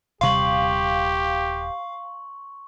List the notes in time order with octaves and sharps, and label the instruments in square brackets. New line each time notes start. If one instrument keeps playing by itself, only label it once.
[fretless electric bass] D#1 C3 G3 [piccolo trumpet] G4 [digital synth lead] F5 [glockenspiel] C6 C#6 F#7